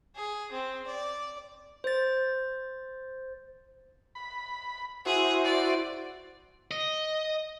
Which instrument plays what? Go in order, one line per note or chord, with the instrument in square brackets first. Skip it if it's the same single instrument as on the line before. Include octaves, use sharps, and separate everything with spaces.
[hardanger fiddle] G#4
C4
D5
[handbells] C5 A6
[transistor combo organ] B5
[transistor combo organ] E4 F#4 C5 [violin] G#4
[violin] D5
[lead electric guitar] D#5